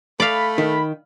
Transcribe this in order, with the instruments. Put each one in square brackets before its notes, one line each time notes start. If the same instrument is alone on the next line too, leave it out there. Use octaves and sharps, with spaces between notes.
[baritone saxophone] A3 [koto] D5 F5 [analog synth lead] B5
[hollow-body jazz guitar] D#3